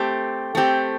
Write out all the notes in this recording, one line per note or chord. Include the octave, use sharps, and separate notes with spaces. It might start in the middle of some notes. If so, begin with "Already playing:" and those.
Already playing: A3 C4 G4
A3 C4 G4